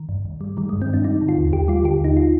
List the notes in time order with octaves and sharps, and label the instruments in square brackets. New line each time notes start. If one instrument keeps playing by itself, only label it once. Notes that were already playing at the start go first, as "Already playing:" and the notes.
Already playing: [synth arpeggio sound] D#3
G2
G2
G3
D#3 G3
G#3
G2
C4
G2 D4
G3 D#4
D3
F4
D#2
D#2 G4
G3 F4
D3 G4
D#2 D#4
F4